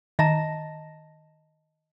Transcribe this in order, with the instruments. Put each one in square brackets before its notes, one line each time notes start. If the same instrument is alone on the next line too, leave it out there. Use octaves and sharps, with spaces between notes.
[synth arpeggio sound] D#3 A#6 [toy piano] D#5 A5 A#5